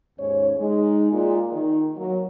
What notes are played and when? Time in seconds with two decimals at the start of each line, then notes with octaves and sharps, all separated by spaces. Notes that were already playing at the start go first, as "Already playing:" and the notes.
0.18 D#2 G#2 C#4 C#5
0.57 G#3 D#4
1.12 A#2 G#3 F4
1.51 D#3
1.97 F#3 A#3 F#4